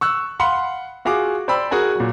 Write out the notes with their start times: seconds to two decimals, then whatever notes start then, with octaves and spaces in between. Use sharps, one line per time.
0.01 C#6 E6 F#6
0.40 F5 F#5 B5 C6
1.05 F4 F#4 G#4 F5 D6
1.48 C5 D5 G5 B5 E6
1.71 F#4 G#4 A#4 G#5
1.96 A#2 F#3